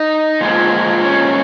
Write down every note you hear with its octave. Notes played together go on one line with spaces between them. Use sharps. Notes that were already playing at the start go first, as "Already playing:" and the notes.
Already playing: D#4
A#2 F3 G#3
C#4